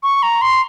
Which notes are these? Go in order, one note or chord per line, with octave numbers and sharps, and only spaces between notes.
C#6
A#5
C6